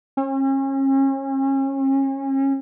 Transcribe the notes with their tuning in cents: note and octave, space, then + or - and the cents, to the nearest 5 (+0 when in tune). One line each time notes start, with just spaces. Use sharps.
C#4 -35